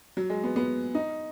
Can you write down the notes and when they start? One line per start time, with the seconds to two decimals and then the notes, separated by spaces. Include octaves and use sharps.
0.17 F#3
0.30 G#3
0.43 B3
0.56 B3
0.95 D#4